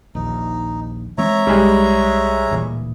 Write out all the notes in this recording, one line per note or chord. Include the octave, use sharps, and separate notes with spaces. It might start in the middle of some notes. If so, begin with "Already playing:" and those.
A#1 D#2 D#4
E3 G#3 C4 C#5 E5 A#5
B1 G3 G#3
D1 A#2 E3